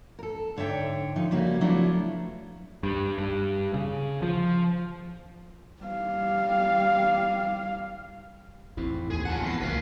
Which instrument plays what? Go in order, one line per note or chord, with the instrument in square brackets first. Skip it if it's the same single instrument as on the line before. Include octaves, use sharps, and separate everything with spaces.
[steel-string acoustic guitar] A4 A#4
G#2 D3 C#5 E5 G5
F3 D#4
C#3 G3 A#3 C#4 F#4
F3 F#3 A3 B3 D4 E4
[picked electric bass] G2
G2
C#3
F3
[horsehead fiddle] G3 F5
[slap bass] A1 F2 G#2 [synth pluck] C4 E4
[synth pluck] D#2 [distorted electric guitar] G#4
[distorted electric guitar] F3 F#5 [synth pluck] G#5 A5 F#6
[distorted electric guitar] E2 E3 [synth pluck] A#6 C7
[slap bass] C2 D#3 F#3 [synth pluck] A3 A#3 B6 [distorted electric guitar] B4 F5